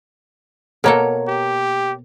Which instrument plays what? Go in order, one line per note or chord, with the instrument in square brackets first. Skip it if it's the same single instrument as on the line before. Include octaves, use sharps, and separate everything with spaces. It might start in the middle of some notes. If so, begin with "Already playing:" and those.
[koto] B2 A#3 A4 [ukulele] A#4 C#5 A#5
[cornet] G4